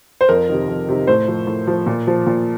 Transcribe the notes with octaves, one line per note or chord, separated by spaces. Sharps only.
C5
F2 A#4
C3 D#3
F2
C3 D#3
A2 C5
F3
A2
F3
A#2
F3
A#2